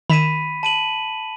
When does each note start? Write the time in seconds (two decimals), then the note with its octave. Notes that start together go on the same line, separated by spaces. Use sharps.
0.10 D#3 B5 B6 D#7 E7
0.63 A5 D#7 F#7